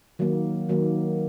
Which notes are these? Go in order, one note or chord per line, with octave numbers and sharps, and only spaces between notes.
D#3 F#3 A#3
D#3 F#3 A#3